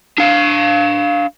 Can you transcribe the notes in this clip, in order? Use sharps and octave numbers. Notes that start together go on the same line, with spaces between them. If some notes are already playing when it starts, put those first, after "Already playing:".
D4 F5